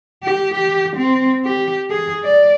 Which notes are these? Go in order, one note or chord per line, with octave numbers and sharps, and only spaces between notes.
G4
G4
C4
G4
G#4
D5